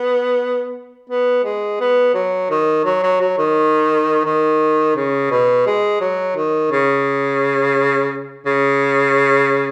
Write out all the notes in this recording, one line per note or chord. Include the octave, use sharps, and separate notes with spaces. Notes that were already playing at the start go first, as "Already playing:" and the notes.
Already playing: B3
B3
G#3
B3
F#3
D#3
F#3
F#3
F#3
D#3
D#3
C#3
B2
G#3
F#3
D#3
C#3
C#3